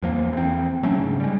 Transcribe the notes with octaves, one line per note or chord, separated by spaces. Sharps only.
E2 F3 A#3
E2 C4
F#3 A3 C#4 D4
G#2 C#3
G3 G#3